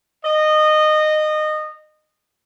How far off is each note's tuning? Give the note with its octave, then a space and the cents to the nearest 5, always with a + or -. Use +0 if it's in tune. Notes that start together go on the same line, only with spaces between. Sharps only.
D#5 -20